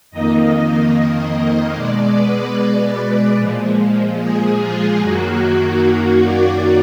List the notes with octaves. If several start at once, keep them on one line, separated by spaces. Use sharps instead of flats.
F2 D#3 A#3 D#5
D#5
B2 G#3 D5
B4
B4
A#2 F3 G#3
G#4
F4
F#2 D#3 F#3 A#3 F#4
D5